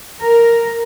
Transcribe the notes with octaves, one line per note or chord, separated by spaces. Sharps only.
A#4